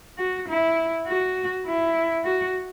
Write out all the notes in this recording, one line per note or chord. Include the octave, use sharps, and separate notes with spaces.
F#4
E4
F#4
E4
F#4